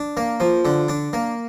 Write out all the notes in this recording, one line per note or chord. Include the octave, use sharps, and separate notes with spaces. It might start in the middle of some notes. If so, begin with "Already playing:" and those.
Already playing: D4
A#3
F3
D3
D4
A#3